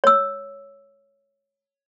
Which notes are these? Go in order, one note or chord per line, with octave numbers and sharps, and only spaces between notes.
C#5 E6